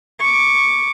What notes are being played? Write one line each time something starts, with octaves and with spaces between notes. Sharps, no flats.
C#6 D6